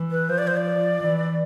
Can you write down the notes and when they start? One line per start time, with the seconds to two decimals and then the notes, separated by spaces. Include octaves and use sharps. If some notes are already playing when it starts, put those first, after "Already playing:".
Already playing: E3
0.11 B4
0.29 F3 C5
0.38 D5
0.47 C5
0.57 D5
1.01 E3